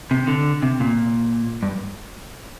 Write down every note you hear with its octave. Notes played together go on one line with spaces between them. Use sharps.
C3
D3
C3
A#2
G2